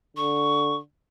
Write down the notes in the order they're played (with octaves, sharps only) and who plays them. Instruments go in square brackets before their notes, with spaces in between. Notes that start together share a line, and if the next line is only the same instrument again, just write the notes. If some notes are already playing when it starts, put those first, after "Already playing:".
[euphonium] D3 [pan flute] C#6